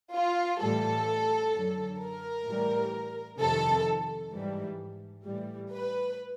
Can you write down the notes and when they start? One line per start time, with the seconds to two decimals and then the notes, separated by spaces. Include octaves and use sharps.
0.14 F4
0.60 A2 E3 G3 A4
1.53 F#2 D3 F#3
2.00 A#4
2.47 A2 E3 G3
3.40 F2 C3 D#3 A4
4.33 G#2 E3 G3
5.26 A2 E3 G3
5.72 B4